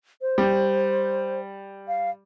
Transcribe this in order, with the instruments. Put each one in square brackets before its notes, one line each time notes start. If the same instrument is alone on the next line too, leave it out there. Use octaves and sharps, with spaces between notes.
[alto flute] C5
[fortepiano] G3
[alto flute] F5